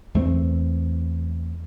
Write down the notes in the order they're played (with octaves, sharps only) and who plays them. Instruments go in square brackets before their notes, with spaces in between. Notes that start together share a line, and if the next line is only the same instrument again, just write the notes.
[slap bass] E2 A3 C4